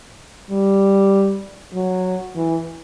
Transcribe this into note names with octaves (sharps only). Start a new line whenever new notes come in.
G3
F#3
E3